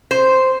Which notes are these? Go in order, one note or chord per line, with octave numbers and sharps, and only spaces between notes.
C5